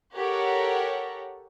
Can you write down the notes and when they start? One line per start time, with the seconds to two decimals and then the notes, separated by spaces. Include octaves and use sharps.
0.16 G4 A4 A#4 C#5 F#5